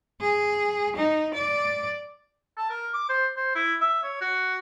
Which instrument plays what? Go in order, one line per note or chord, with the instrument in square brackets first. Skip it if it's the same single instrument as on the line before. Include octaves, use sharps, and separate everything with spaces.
[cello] G#4
D#4
D5
[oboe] A5
A#4
D6
C5
C5
E4
E5
C#5
F#4